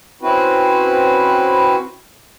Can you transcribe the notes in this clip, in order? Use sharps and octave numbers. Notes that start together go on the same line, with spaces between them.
C4 C#4 E4 F#4 B4